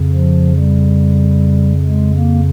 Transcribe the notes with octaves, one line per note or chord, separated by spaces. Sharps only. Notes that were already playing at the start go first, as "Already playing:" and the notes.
Already playing: F2 C#3
F3
G3
G#3
A#3